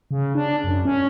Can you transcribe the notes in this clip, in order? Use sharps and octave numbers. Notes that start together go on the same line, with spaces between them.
C#3
D4
F#2
C#4